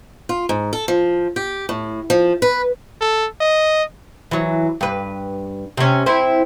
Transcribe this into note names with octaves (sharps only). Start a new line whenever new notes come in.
F4
G#2
A4
F3
G4
A2
F3
B4
A4
D#5
E3 F#3
G2 B4
C3 C#4
C4 E4